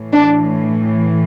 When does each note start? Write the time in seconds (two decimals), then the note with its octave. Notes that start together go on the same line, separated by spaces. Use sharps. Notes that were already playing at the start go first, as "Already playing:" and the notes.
Already playing: A2 E3
0.13 D4